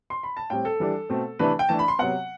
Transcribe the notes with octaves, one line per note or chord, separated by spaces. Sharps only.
C6
B5
A5
A2 G3 C4 G5
A4
E3 G3 D4
B2 A3 C4
C3 E3 A3 D4 B4
G5
E3 A3 D4 A5
B5
C6
C3 F#3 B3 F#5